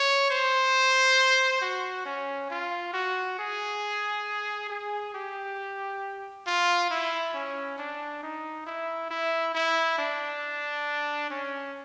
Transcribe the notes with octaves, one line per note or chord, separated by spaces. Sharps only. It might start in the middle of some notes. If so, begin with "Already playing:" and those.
Already playing: C#5
C5
F#4
C#4
F4
F#4
G#4
G#4
G4
F4
E4
C#4
D4
D#4
E4
E4
E4
D4
C#4